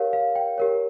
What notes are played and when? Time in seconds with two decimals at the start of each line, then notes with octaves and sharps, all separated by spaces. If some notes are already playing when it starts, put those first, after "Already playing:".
Already playing: G4 A#4 C#5 F5
0.13 F5
0.36 G5
0.58 G4 A#4 C#5